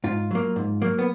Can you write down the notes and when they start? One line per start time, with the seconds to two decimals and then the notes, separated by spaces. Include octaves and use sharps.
0.04 G#2 F4
0.31 F#3 A#3
0.56 G#2
0.82 F#3 A#3
0.99 B3